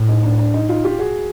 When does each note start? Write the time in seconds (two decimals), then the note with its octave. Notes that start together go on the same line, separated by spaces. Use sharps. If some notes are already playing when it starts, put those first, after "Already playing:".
Already playing: A2
0.09 D#4
0.23 D4
0.38 D4
0.54 D#4
0.69 D#4 F4
0.84 F4 G4
0.99 F#4 G#4